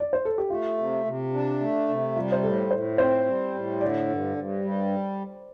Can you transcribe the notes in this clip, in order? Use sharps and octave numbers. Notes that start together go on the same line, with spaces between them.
D5
C5
A4
G4
A3 F4
C3
C3
D4
A3
C3
G3 F4
C5
A2 A4
A2 C5
C4 C5
G3
A2
D3 D5
G2
G2
G3